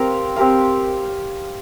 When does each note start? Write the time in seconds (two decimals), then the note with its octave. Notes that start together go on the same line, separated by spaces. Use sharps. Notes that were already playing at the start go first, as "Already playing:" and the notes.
Already playing: C4 G4 A#4 F5
0.36 C4 G4 A#4 F5